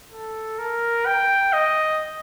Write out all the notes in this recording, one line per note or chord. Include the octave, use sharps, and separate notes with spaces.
A4
A#4
G5
D#5